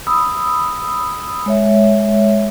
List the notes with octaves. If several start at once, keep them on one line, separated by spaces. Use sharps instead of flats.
B5 D#6 E6
G#3 C#5 E5